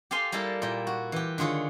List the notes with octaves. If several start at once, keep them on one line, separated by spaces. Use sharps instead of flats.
G4 A4 F5 G#5 C6
G3 A#3 E4 A4
A#2 E4 G5
F#4
E3 G4
D3 D#3 F4 G#4 C#5